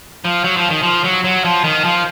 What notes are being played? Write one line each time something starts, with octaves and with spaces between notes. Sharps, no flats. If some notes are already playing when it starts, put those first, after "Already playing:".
F3
F#3
F3
D#3
F3
F#3
F#3
F3
D#3
F3